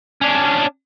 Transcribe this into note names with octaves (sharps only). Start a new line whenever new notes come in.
C#4 D4